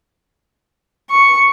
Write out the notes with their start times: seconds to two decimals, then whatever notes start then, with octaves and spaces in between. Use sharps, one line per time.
1.11 C#6